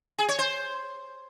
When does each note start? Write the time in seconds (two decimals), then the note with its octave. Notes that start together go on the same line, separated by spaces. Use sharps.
0.18 G#4
0.29 C#5
0.39 C5